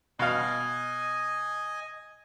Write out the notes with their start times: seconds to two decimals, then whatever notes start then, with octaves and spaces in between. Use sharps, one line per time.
0.19 B2 D#5 F5 G#5